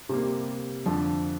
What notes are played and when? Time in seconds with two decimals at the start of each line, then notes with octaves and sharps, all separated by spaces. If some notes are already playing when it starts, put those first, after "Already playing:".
0.09 C3 G3 A#3
0.86 F2 D3 F3